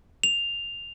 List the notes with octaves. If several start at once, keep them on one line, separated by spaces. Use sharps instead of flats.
F7